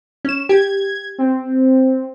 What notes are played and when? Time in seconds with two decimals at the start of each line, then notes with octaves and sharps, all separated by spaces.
0.25 C#4 E7
0.49 G4 G#6
1.18 C4